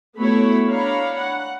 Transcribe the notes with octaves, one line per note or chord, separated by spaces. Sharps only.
A3 B3 E4 F#4 C#5 B5
D4 C#5 F5 A#5 B5
F#5